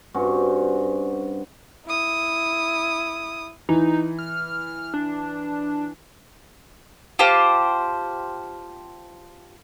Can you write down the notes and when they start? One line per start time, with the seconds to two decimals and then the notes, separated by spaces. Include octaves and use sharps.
0.14 G2 C4 C#4 F#4
1.86 E4 D#6
3.69 E3 D#4
4.19 F6
4.94 D4
7.19 F4 G4 C5 A5